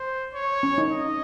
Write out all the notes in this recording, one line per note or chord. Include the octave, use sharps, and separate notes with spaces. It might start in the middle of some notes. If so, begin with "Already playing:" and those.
Already playing: C5
C#5
C#4
D#4
D#5